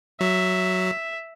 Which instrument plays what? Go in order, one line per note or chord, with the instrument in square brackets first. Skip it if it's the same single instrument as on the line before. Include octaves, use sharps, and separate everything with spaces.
[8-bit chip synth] F#3 [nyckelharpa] E5